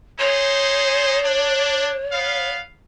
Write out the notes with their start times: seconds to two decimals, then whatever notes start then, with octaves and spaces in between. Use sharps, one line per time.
0.19 D#4 G#4 C5 C#5
1.24 D4
2.12 B3 F5